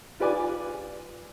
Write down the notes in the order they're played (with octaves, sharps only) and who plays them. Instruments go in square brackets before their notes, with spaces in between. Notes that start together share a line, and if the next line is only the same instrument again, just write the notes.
[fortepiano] F4 G4 B4 D5 G#5 D6